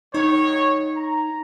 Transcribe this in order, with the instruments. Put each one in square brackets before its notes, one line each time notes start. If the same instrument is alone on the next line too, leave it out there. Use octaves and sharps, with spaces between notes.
[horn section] D#3 F#3 C#5 [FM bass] D#4
[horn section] A#5